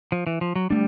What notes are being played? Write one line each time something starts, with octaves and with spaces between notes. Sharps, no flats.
F3
E3
F3
F#3
G3 A3 D4